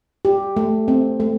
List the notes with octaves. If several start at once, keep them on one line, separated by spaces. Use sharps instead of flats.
G4
A3
C4
A3